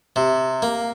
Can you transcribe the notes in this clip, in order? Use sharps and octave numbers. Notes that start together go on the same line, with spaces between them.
C3
A#3